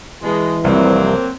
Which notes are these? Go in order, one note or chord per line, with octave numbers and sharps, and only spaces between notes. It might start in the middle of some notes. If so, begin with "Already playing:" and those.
B2 E3 G#3
F1 C2 F#3 A#3 C4